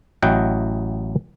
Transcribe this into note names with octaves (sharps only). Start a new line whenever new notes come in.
A1 F#3 E4 D#5 F#5 G5